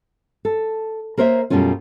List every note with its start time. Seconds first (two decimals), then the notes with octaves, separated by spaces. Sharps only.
0.45 A4
1.17 A#3 A#4 C5 C#5 E5
1.50 F#2 B2 G3 A3 C#4 F4